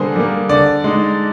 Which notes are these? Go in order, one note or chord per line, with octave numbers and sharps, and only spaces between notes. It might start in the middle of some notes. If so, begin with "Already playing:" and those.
Already playing: D3 G3 A#3 G#4 C5
G3 A#3
D3 D5
G#3 D#4